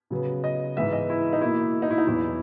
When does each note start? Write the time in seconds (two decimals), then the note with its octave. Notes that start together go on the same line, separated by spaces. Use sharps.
0.10 C#3 F#3 B3
0.44 D#5
0.76 G#2 E3 G#3 B3 E5
0.92 D#5
1.10 E4
1.33 D#4
1.41 B2 A#3 E4
1.82 D#4
1.90 E4
1.98 D#4
2.07 E2 B2 F#3 E4